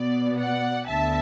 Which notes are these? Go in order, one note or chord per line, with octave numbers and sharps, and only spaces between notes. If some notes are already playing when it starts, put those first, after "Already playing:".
Already playing: B2 B3 D5
D5 F#5
D2 D3 B3 E5 A5